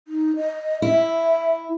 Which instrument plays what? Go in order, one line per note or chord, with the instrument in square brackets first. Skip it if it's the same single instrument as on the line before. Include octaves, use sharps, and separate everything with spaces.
[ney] D#4
D#5
[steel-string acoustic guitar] E4 [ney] E5